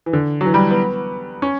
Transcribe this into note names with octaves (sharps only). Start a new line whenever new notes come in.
E3
D3
F#3
E3
G3
B3
C#4